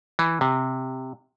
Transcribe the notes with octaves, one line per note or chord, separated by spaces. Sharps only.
E3
C3